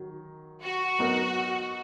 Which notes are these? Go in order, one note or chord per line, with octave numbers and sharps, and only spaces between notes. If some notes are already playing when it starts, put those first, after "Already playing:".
Already playing: D#3 F#3
F#4
F#3 B3 D#4 A#4